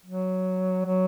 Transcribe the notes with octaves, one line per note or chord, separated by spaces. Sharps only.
F#3
F#3